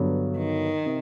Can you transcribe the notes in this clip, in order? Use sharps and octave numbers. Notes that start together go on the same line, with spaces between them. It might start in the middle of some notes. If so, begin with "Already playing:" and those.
Already playing: G2 D3 F#3 B3
D#3
C3